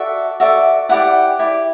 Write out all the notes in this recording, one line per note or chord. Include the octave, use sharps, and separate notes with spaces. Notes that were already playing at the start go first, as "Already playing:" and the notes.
Already playing: F#4 A4 D5 E5
F#4 A4 D5 E5
E4 G4 D5 F#5
E4 G4 D5